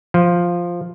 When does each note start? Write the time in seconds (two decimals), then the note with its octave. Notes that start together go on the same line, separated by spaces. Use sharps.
0.14 F3